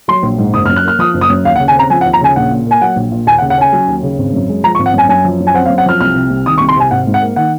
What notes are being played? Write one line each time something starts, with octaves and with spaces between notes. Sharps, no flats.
F#3 C6
A#1
G#2
F#1 D#6
F6
F#2
F#6
A#3 F6
F3 D#6
F#1
D#6
F#2
D#2 F5
F#5
C#3
G#5
C4 A#5
F3 G#5
F#5
D#2
A#5
C#3 G#5
A#1 F#5
A#2
A#3 G#5
F#3 F#5
A#1
A#2
D#2 G#5
F#5
C#3
F#5
C#4 G#5
F#3
D#2
C#3
G#1
F#2
G#3
F3 A#5
C#6
G#1
F#5
F#2 G#5
F#2 G#5
F3
F#2
G#5
C4 F#5
F5
F#2
F#5
F3 F6
C2 F6
C3
C2
D#3 D#6
C#6
C2
C6
C3 G#5
G#1 F#5
G#2
F#5
A#3
D#3 F#5